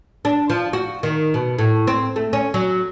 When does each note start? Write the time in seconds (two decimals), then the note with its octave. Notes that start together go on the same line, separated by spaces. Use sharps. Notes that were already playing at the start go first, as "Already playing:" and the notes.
0.25 D4
0.50 F3
0.73 F#4
1.03 D#3
1.34 B2
1.58 A2
1.87 C4
2.16 A3
2.33 C#4
2.54 F#3